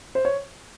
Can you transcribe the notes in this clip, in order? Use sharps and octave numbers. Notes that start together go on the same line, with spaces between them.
C5
C#5